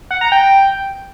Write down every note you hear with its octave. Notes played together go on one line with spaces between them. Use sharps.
F#5
A#5
G5